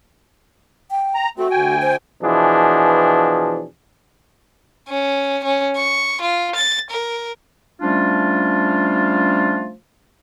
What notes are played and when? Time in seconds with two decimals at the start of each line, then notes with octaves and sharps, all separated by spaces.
0.91 G5
1.15 A#5
1.38 A3 C4 F#4
1.51 D2 G5 G#5
1.82 C5
2.22 B2 E3 F3 D4 G#4
4.89 C#4
5.44 C#4
5.77 C#6
6.21 F4
6.55 A6
6.90 A#4
7.82 F3 G3 A3 C#4 D4 F4